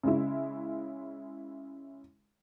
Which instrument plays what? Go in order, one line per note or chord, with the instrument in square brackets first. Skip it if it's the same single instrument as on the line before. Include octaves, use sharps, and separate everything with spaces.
[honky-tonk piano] C#3 G#3 E4